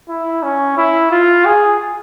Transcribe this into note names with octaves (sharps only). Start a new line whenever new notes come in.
E4
C#4
E4
F4
G#4